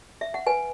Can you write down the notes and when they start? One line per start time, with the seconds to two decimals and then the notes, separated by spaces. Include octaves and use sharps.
0.21 E5
0.34 F#5
0.46 B4 G#5